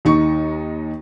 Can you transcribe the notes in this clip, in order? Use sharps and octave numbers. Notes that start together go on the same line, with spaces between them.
D#2 D#4 C#6